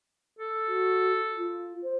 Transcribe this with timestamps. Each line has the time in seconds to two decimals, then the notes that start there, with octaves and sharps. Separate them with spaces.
0.39 A4
0.68 F#4
1.37 F4
1.83 C5